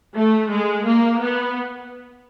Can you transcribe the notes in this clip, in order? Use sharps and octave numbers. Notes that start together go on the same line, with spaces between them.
A3
G#3
A#3
B3